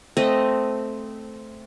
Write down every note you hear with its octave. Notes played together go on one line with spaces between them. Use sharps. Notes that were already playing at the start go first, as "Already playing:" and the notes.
A3 C4 D#5